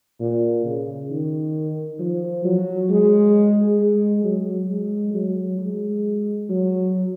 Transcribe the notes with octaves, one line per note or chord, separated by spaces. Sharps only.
A#2
C#3
D#3
F3
F#3
G#3
G#3
F#3
G#3
F#3
G#3
F#3